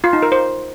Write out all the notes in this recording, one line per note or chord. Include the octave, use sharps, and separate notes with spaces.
F4
D#4
A#4
C5